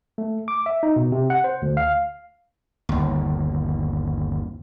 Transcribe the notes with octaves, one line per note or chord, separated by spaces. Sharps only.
A3
D6
E5
D#4
B2
C3
F#5
C5
D2
F5
G1 D#2